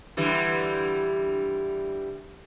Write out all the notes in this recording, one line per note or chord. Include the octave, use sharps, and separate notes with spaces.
D3 E3 G3